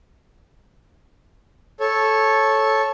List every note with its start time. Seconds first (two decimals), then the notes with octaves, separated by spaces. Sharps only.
1.80 A4 C#5